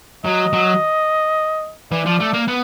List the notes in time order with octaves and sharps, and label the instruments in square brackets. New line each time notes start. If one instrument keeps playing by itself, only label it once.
[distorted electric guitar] F#3 [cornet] D#5
[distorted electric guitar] F#3
[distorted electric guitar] E3 [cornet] D5
[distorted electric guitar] F3
A3
A#3
B3